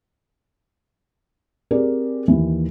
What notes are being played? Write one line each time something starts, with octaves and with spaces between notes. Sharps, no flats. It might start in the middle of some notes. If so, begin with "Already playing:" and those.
C4 G4 G#4 A#4 D5
D#2 E3